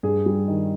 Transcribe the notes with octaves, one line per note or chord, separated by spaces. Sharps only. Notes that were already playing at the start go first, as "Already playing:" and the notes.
G2 G#4
G3
D#3